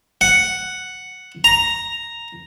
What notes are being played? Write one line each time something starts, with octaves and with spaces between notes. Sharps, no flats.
F#5
A#5